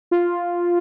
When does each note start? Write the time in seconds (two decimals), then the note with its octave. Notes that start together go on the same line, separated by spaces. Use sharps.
0.11 F4